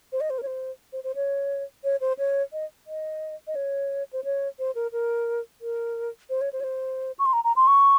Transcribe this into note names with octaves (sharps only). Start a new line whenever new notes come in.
C5
D#5
C5
A#4
C#5
C5
C5
C5
C#5
C#5
C5
C#5
D#5
D#5
D#5
C#5
C5
C#5
C5
A#4
A#4
A#4
C5
C#5
C5
C#5
C5
C#6
C6
A#5
A#5
C6
C#6